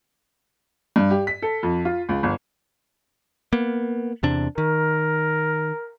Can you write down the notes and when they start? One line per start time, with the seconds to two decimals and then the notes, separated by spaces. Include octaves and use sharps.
0.96 G2
1.10 G4
1.27 B6
1.42 A4
1.63 F2
1.85 F4
2.09 C#2
2.23 G1
3.53 A#3 B3
4.23 E2 C3 D4
4.58 D#3 A#4